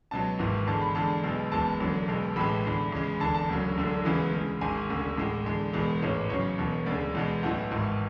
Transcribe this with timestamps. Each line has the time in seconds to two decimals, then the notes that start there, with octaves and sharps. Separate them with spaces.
0.11 C#2 B2 F#3 A5
0.39 G#1 G#2 E3
0.67 E2 D3 G#3 A5
0.81 B5
0.95 E2 D3 G#3 A5
1.24 B1 B2 G#3
1.51 F#1 E2 B2 G#3 A5
1.79 E1 E2 D3 F#3
2.08 B1 B2 G#3
2.36 A1 A2 E3 G#3 B5
2.64 E2 D3 G#3
2.92 E2 C#3 G#3
3.20 F#1 E2 D3 A5
3.34 A5
3.48 E1 D2 C#3 F#3
3.77 E1 D2 D3 F#3
4.05 E2 C#3 E3 G#3
4.33 D2 C#3 G#3
4.61 G#1 G#2 G#3 G#5
4.89 E1 D2 C#3
5.17 A1 A2 G#3
5.46 E2 D3 G#3
5.73 E1 E2 B2 G#3
6.02 A1 G#2 E3 G#3 C#5
6.30 E2 C#3 F#3 C#5
6.58 E1 E2 B2
6.86 D2 C#3 G#3 D5
7.15 E2 B2 G#3
7.43 B1 A2 E3 F#5
7.71 G#1 G#2 E3